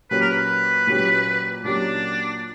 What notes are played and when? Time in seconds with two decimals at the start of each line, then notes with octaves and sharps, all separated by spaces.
0.10 A#2 F#3 A#3 C#4 G4 B4
0.21 A#4
0.30 B4
0.87 A#2 F#3 A#3 C#4 G4
1.64 A#2 F#3 A#3 C#4 D4 G4